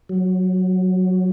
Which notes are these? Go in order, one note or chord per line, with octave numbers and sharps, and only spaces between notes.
F#3